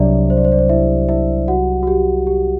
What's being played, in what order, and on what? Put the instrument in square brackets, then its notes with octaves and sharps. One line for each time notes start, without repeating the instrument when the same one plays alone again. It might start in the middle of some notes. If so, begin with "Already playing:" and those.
Already playing: [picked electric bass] C2 C3 F#3 [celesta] D4 D5
[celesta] C5
D5
C5
D5
C5
E4 E5
E4 E5
F#4 F#5
F#4
G4
G4